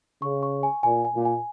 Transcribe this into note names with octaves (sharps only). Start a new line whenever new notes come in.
C#3 C#6
C#6
G#5
A#2 G#5
G#5
A#2
G#5